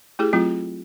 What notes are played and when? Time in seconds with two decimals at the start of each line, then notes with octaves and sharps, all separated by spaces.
0.19 A3 E4 G4 G#4
0.33 F#3 A3 C4 F4